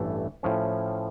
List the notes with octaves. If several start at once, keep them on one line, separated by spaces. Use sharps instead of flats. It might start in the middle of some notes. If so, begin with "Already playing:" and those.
Already playing: A1 G2 E3 A3
A2 F3 C#4